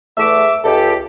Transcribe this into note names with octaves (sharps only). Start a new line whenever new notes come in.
E2 A3 E5 D6
C#2 G4 A4